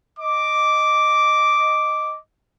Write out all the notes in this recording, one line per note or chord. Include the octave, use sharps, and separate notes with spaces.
D#5 D6